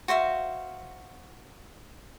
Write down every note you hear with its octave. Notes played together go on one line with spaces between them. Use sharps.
F#4 C5 E5 F5